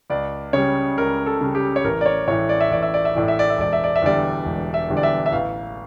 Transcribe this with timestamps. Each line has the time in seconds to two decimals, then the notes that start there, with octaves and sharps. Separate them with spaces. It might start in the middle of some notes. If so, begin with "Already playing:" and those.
0.10 C#2 D5
0.53 C#3 G3 C#5
0.97 C#2 A#4
1.26 A4
1.41 C#3 G3
1.55 G4
1.76 C#5
1.84 A1 A#4
2.01 D5
2.06 C#5
2.27 A2 E3 C#5
2.49 D5
2.61 E5
2.71 A1 D5
2.82 E5
2.94 D5
3.05 E5
3.15 A2 E3 D5
3.28 E5
3.39 D5
3.50 E5
3.58 E1 D5
3.73 E5
3.84 D5
3.96 E5
4.02 E2 D3 G3 D5
4.45 E1
4.74 E5
4.89 E2 D3 G3
4.97 D5
5.03 E5
5.26 E5
5.32 A1 F5